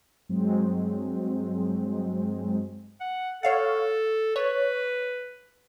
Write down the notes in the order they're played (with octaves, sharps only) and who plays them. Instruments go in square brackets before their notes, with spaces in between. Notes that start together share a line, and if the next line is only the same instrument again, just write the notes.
[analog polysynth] G2 F#3 G#3 C4
[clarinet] F#5
[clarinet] A4 [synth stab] C#5 F5 F#5
[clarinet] B4 [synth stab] C#5